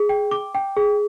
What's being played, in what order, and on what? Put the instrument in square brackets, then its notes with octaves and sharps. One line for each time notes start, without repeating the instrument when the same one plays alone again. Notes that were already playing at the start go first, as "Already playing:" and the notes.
Already playing: [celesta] G#4
G5
D6
G5
G#4